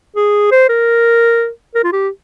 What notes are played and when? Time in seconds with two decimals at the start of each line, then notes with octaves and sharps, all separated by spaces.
0.16 G#4
0.52 C5
0.69 A#4
1.75 A#4
1.84 F4
1.93 G4